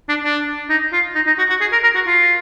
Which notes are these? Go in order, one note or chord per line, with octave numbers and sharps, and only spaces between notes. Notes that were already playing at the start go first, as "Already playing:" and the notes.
D4
D4
D#4
F4
D#4
D#4
F#4
F#4
G#4
A#4
A#4
F#4
F4